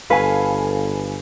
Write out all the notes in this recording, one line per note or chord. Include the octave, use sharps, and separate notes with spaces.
G1 A4 B4 F5 G#5